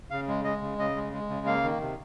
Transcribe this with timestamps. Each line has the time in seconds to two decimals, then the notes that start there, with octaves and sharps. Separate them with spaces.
0.10 C#3 F5
0.28 G#3
0.44 G#3 D#5
0.61 C#3
0.78 C#3 D#5
0.96 G#3
1.13 G#3
1.29 C#3
1.46 A#3 F5
1.64 D#3
1.81 C3